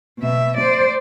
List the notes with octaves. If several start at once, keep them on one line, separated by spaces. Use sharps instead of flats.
B2 E5
C5 D5